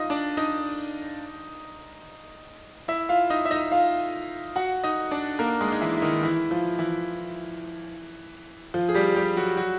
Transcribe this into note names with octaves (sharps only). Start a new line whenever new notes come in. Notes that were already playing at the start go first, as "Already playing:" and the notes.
Already playing: D#4 F4 D#5
D4 D5
D#4 D#5
E4 E5
F4 F5
D#4 D#5
E5
D#4 D#5
F4 F5
F#4 F#5
D#4 D#5
D4 D5
A#3 A#4
G#3 G#4
D#4
E3 E4
E4
D#3 D#4
E3 E4
F3 F4
E3 E4
F3 F4
G#4
G3 G4
G3 G4
F#3 F#4
F#3 F#4